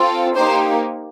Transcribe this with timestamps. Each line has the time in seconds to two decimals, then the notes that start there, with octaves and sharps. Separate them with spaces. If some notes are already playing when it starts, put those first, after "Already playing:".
Already playing: C4 F4 A4
0.36 A#3 D#4 G4 C5